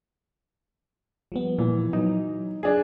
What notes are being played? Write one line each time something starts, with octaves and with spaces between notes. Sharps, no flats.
F3 G3 B3
A#2 E3
F#3 D#4
D4 G#4